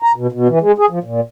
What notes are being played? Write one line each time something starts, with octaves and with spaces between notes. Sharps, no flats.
A#5
B2
B2
E3
G#3
G#4
F3
A#2